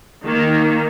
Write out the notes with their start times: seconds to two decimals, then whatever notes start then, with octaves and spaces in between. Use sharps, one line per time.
0.22 D#3 A#3